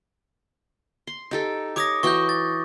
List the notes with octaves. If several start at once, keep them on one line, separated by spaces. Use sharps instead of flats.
C6
D#4 G4 A4
G4 C#5 D6 D#6 A#6
E3 F#4 G5 C#6 G6
A6